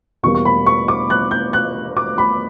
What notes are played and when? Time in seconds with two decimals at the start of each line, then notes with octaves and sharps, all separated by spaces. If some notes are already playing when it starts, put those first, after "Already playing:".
0.23 E2 B2 G3 A#3 C#6
0.35 C#6
0.45 B5
0.66 C#6
0.88 D6
1.10 F#6
1.31 G6
1.53 F#6
1.97 D6
2.18 B5